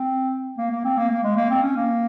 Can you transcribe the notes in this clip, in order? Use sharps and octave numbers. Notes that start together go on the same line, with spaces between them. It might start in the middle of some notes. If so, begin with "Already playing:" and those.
Already playing: C4
A#3
A#3
C4
A#3
A#3
G#3
A#3
C4
C#4
A#3